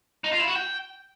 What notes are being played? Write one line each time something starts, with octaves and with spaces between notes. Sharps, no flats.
D#4
F4
E4
F#4
G5